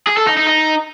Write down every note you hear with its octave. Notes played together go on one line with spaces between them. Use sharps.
G#4
A4
D#4
D#4
D#4